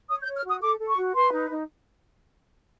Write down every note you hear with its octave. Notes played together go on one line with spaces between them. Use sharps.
C#5 D#6
G6
C#5
F6
F#4 D#6
A4 D6
A4
C#6
F#4
B4 C6
D#4
D#4